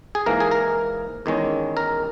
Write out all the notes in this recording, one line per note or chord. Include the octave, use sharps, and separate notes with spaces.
G#4
G#2 E3 A#3 A#4
G#4
A#4
E2 D#3 G#3 C#4
A#4